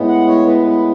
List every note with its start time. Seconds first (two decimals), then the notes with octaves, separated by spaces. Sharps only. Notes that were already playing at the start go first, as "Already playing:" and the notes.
Already playing: A2 G#3 B3
0.08 F#5
0.27 C#5
0.47 B4
0.67 B4